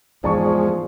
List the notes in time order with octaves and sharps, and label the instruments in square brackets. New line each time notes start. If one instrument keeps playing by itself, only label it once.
[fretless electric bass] E2 G#2 [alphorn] F3 [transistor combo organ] G#3 [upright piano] D5 A5 C#6